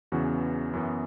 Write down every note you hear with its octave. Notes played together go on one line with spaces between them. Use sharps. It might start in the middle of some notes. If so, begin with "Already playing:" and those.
E2 C#3 E3 B3 F#4
F#2 E3 B3